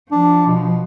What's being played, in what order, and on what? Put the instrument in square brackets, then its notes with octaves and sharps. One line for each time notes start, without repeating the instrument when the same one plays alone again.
[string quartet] F3 [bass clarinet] D4
[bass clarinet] B2